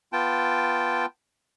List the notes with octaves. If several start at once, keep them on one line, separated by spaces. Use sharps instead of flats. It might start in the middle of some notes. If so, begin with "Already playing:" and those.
B3 F4 G5 A5